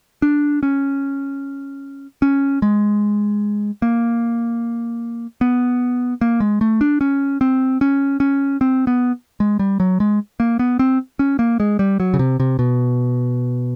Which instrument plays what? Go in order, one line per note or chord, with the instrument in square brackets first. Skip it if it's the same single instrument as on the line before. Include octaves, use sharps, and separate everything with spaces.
[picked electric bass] D4
C#4
C#4
G#3
A#3
B3
A#3
G#3
A3
D4
C#4
C4
C#4
C#4
C4
B3
G#3
G3
F#3
G#3
A#3
B3
C4
C#4
A#3
G#3
G3
F#3
C#3
C3
C3
B2